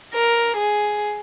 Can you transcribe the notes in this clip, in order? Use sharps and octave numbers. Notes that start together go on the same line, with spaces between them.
A#4
G#4